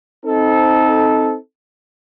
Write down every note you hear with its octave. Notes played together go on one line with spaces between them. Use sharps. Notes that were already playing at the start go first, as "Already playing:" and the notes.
C4 D#4 A4